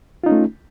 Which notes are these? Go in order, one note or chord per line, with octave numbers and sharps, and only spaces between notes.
A3 C#4 D#4 F4